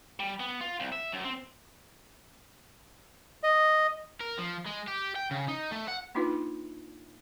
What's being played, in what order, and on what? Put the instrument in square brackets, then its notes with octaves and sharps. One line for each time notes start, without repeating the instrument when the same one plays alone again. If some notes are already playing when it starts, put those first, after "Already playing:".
[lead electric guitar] G3
B3
F4
C2
E5
F#2
C4
[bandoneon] D#5
[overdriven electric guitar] A#4
F3
G#3
G4
G5
C#3
D#4
A3
F#5
[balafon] A#3 D4 D#4 F4 B4